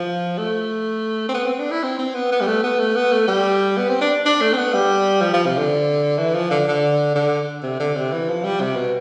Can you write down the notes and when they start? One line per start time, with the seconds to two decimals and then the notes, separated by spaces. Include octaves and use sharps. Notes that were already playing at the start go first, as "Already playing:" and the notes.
Already playing: F3
0.38 A3
1.29 C4
1.34 B3
1.46 C4
1.59 D4
1.71 E4
1.83 C4
1.99 C4
2.15 B3
2.32 B3
2.41 G3
2.47 A3
2.63 B3
2.79 A3
2.96 B3
3.12 A3
3.28 G3
3.77 B3
3.89 C4
4.01 D4
4.25 D4
4.41 A3
4.53 C4
4.57 B3
4.74 G3
5.21 F3
5.33 F3
5.46 C3
5.58 D3
6.18 E3
6.34 F3
6.50 D3
6.67 D3
7.15 D3
7.63 C3
7.80 D3
7.96 C3
8.12 E3
8.29 F3
8.45 G3
8.61 C3
8.76 B2